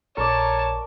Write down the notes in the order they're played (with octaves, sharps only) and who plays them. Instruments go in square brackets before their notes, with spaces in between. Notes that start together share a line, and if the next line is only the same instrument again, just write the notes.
[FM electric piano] A#1 C#6 [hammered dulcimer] A#4 D5 [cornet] C#5 [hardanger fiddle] A5